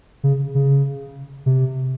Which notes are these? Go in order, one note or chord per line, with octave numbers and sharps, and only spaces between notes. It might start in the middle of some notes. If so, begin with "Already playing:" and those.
C#3
C#3
C3